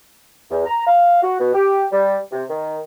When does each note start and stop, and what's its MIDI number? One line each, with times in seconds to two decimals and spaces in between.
0.51 0.64 40
0.66 0.85 82
0.87 1.21 77
1.22 1.38 66
1.40 1.53 47
1.54 1.85 67
1.92 2.17 55
2.32 2.43 48
2.50 2.79 51